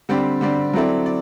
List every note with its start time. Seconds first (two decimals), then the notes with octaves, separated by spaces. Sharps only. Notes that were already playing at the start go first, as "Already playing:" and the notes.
0.09 D3 G3 C4 G4 D5
0.41 D3 G3 C4 G4 D5
0.73 F#3 C4 E4 A4 D5
1.06 D5